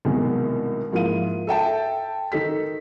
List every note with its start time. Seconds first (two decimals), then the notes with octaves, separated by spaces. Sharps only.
0.05 C2 B2 D#3 F#3 G#3
0.92 G#2 F3 A#3 E4 F5 D#7
1.47 A4 E5 G5 A5
2.32 D#3 D#4 A4 B6